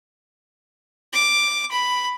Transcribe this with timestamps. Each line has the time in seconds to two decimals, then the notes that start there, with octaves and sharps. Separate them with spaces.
1.13 D6
1.71 B5